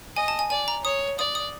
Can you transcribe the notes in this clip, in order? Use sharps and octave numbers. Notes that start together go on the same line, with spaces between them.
D#5 G#5
A5
G#5
D5 G#5
A#5
C#5 D#6
D5 D#6
D#6